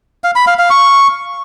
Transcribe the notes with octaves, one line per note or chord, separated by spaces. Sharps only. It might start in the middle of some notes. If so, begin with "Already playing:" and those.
F5
B5
F5
F5
C#6